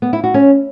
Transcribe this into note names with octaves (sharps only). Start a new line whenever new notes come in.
B3
E4
F#4
C#4